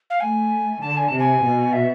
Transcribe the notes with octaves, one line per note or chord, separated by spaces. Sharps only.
F5
A3 G#5
D3 A5
G#5
C3 A5
G#5
B2
E5